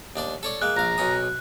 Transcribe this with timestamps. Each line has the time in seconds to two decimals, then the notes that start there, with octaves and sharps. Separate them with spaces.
0.16 D#2 D4 D5
0.43 A4 C#5 D5
0.62 G#3 A#3 F#6
0.77 A#1 F5 A#5 F#6
0.98 B1 C#4 D#6